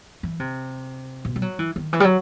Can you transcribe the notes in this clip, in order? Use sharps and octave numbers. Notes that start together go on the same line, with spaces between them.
E3
C3
B2
G3
F#3
E3
D#3
E3
G3
F#3